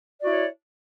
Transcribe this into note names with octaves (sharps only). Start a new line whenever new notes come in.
E4 F#4 C#5 D5